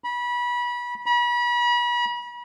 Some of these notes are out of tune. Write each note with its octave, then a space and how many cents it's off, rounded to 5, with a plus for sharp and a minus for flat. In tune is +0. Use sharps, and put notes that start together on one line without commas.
B5 -25
B5 -35